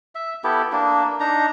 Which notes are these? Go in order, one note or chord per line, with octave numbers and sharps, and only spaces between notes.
E5
B3 E4 G4 A4
A#3 D4
D4 D#4 A#5